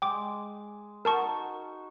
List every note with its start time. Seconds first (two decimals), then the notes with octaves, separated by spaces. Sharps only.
0.02 G#3 G5 D6
1.05 D#4 F#4 A#4 A5 C#6